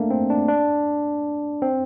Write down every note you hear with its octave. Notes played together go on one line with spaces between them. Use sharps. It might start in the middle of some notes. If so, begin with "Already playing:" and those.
Already playing: A3 A#3 D4
C4
D4
D4
C4